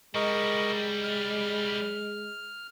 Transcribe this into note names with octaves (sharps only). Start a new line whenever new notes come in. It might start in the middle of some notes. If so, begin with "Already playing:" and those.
G3 G#3 E4 A#4 D#5 C#6
F6